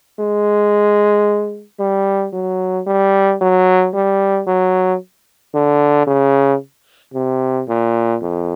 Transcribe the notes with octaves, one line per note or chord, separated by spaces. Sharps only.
G#3
G3
F#3
G3
F#3
G3
F#3
D3
C#3
C3
A#2
F2